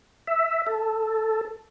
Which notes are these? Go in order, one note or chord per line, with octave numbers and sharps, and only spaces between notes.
E5
A4